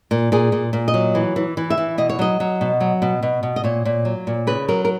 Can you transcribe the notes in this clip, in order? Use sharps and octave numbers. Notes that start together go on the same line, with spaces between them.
A#2
A#2 G#4
A#2
A#2
D#5
F#3
E3
E3
E3
E5
E3
B2 D#5
C#5
F#3 D#5
F#3
B2
F#3
B2
B2
B2
D#5
A#2 C#5
A#2
F#3
A#2
C#3 B4
F#3 A#4
A#4